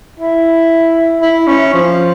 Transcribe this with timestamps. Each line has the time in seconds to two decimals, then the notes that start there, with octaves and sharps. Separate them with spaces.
0.20 E4
1.22 E4
1.47 C#4
1.73 F3